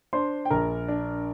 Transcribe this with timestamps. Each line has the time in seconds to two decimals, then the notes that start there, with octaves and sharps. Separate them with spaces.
0.13 D4 C5 C6
0.45 G5
0.50 A#1 A#4 A#5
0.88 D4